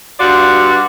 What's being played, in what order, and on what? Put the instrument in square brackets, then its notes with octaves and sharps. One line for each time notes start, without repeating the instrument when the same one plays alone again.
[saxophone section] G2 F4 F#4 D5